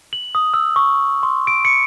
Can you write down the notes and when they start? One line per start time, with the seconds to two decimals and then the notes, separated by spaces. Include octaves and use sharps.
0.13 F#7
0.35 D#6
0.54 E6
0.76 C#6
1.23 C6
1.47 D7
1.65 C#7